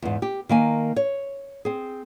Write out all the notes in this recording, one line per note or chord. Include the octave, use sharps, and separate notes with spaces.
E2 G#2
G4
D#3 A#3 G#5
C#5
C4 G#4